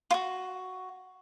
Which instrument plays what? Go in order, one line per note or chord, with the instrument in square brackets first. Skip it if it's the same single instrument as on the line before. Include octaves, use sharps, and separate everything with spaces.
[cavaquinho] F4 F#4